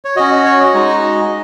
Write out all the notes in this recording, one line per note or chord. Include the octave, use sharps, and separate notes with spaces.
C#5
C#4 F#4 D#5
C#5
D#5
G#3 D#4 F#4